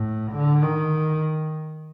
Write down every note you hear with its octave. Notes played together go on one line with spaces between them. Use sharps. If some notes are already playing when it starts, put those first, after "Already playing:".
Already playing: A2
D3
D#3